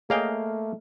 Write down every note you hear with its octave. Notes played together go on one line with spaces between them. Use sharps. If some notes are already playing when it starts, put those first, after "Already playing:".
A3 A#3 G#4 C#5 D#5 F5 G5